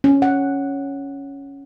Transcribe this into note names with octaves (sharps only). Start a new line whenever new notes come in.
C#4
F#5